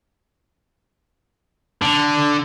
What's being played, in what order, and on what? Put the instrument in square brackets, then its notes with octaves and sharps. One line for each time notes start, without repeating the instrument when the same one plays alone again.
[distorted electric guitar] D3